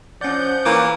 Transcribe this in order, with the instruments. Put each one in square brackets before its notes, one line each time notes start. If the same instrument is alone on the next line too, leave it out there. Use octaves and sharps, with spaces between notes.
[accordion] F3 F#5 G6 [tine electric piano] C#4 D5
[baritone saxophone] E3 [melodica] A#3 C#4 A#4 [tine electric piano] D6